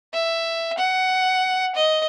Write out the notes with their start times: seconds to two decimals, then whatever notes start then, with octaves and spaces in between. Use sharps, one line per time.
0.14 E5
0.78 F#5
1.75 D#5